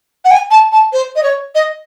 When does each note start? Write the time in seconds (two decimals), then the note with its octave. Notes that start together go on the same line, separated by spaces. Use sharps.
0.24 F#5
0.30 G#5
0.50 A5
0.72 A5
0.92 C5
1.15 D#5
1.23 C#5
1.54 D#5